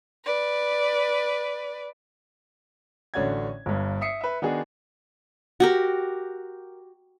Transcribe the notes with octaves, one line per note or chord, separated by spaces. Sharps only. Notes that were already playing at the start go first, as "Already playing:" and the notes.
B4 D5
A1 D3 C#4 F#4 D5 G#6
G1 G2
E5 D#6 C7 C#7
B4 E5
D#3 B3 D4 D#4 F#4 G#4
F#4 G4 A#4